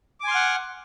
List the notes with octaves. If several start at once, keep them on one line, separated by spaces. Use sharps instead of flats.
F#5 G#5 C6 D6 F6